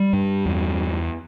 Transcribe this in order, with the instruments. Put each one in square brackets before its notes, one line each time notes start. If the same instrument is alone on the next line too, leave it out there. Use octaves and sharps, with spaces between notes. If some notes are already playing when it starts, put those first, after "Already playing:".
Already playing: [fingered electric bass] G3
G2
E2